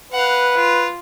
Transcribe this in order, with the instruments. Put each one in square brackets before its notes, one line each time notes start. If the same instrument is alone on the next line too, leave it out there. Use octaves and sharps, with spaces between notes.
[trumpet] B4 [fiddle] F5 F#5
[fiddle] F4